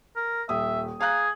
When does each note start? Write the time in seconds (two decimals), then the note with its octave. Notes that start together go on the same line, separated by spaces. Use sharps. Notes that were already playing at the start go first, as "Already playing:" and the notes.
0.16 A#4
0.49 D#1 E5 D#6
1.01 G#4 F5 A#5 F#6